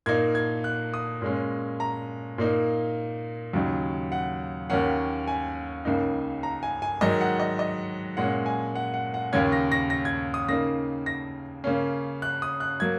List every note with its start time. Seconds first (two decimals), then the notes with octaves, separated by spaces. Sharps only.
0.06 A#2 A#3 D#4 G#6
0.35 G#6
0.64 F#6
0.94 D#6
1.22 A#2 G#3 C#4
1.80 A#5
2.38 A#2 A#3 D#4
3.53 D#2 C#3 F#3 D#4
4.12 F#5
4.70 D#2 D#3 A#3 C#4 F#5
5.28 G#5
5.85 C#2 C#3 A#3 D#4
6.43 A#5
6.63 G#5
6.82 G#5
7.01 G#2 D#3 F#3 D#5
7.21 F#5
7.40 D#5
7.59 D#5
8.17 A#2 G#3 C#4 F#5
8.46 G#5
8.75 F#5
8.94 F#5
9.14 F#5
9.33 D#2 C#3 A#3 C#4 G#6
9.52 A#6
9.72 A#6
9.90 A#6
10.05 G#6
10.34 D#6
10.49 C#3 A#3 D#4 A#6
11.06 A#6
11.64 C#3 A#3 C#4
12.22 F#6
12.42 D#6
12.60 F#6
12.80 F#3 A#3 G#6